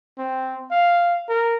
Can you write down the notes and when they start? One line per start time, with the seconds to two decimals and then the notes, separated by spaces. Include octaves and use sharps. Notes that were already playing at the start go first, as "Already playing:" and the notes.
0.18 C4
0.71 F5
1.29 A#4